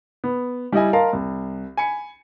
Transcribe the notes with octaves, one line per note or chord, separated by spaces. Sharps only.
B3
G3 E4 D#5 G#5
A#4 D#5 F5 A5 A#5 C6
C2
G#5 B5 C#7